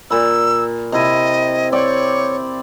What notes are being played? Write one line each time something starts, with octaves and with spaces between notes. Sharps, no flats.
A#2 B5 E6
C3 E4 D#5
C4 C#5 D5 G5